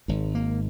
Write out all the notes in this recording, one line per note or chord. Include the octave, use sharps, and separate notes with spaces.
G#1 G#2
A#3